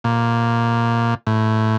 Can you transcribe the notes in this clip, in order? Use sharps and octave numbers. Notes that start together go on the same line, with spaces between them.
A#2
A2